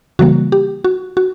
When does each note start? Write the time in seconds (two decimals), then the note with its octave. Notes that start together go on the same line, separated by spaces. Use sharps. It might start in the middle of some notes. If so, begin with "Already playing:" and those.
0.19 C#3 E3 G3 A#3 F#4
0.52 G4
0.84 F#4
1.17 F#4